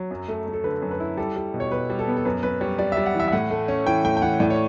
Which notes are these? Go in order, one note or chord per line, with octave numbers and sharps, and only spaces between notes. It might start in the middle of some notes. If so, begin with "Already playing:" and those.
Already playing: F#3
F#2
A3
A3
A4
D3 B4
F#2
B4
E4
G3 A4
G3
B2
C#5
B2 B4
G3
A4
B3
A4
F#2 B4
F#2 B4
G3 C#5
G3 D5
E5
G3
F#5
E3 E5
E5
A2 F#5
A3
C#4
E3 G5
A2 G5
G5
E3 F#5
A2 D5
C#5